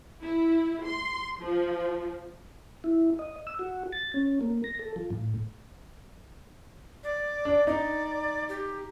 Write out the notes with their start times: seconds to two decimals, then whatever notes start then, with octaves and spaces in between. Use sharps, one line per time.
0.20 E4
0.85 C6
1.40 F3
2.84 E4
3.19 D#5
3.47 E6
3.59 F#4
3.93 A6
4.14 C#4
4.41 A#3
4.64 A#6
4.79 A4
4.96 F3
5.10 A2
7.04 D5
7.45 D4
7.67 D#4 D5
8.49 G4